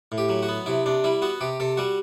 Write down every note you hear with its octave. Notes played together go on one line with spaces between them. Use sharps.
A2
G4
F#3
F#4
B3
C3 E4
C3 D4
G3 E4
B3 F#4
C3 G4
C3 A4
G3 F#4